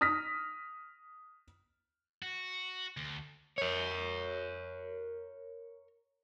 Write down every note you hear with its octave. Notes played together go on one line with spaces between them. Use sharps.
D#6 F6 A#6 B6
F#4
D2
A#4 C#5